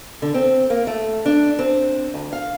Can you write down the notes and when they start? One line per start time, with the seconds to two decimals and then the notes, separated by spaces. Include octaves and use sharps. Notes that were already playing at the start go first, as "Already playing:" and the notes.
0.22 D3
0.34 C4
0.70 A#3
0.87 A3
1.25 D4
1.59 C4
2.14 D2
2.33 F5